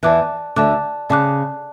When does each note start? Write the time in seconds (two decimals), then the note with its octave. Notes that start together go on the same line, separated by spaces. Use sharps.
0.03 E2 E3 D5 A5 D6 F#6
0.56 D2 D3 D5 A5 D6 F#6
1.10 C#3 D5 A5 D6 F#6